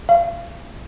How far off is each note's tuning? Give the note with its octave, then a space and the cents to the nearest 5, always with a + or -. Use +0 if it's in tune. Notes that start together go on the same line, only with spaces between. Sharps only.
F5 -30